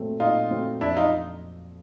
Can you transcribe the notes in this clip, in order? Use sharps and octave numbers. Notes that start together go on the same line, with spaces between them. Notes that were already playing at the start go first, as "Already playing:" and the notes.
Already playing: A#2 F#3 A3 C4
A#2 D#4 F4
F#3 A3 C4
F2 D4 E4
D#4 F4